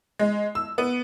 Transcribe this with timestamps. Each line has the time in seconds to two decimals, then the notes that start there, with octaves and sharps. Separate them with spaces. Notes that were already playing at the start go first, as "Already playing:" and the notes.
0.19 G#3
0.55 E6
0.78 B3